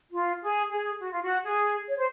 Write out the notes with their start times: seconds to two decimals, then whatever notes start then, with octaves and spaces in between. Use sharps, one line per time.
0.11 F4
0.42 G#4
0.70 G#4
1.00 F#4
1.11 F4
1.22 F#4
1.45 G#4
1.88 C#5
1.97 C5